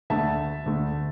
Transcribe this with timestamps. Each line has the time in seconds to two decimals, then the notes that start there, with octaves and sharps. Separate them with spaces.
0.10 D2 D3 A3 E5 A5
0.66 D2 D3 A3